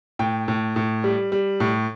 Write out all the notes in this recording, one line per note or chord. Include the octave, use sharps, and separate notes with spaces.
A2 G5
A2
A2
G3
G3
A2